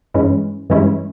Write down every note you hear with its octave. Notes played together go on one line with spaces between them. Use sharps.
G2 E3 G#3 C#4 E4
G2 E3 G#3 C#4 E4